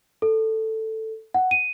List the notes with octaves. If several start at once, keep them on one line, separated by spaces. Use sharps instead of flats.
A4
F#5
D#7